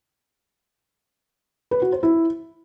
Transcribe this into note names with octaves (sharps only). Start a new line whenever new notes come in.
B4
F#4
C5
E4